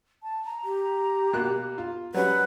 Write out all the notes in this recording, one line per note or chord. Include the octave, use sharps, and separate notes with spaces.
A5
A#5
G4
B2 A#3 F#6
F4
F#3 G3 C#4 B4 F#5